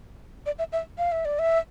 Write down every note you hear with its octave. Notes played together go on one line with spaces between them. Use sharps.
D5
E5
E5
F5
E5
D5
E5